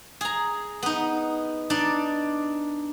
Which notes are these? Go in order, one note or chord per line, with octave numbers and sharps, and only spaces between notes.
G#4 A#5
B3 D#4
D4 D#4 D5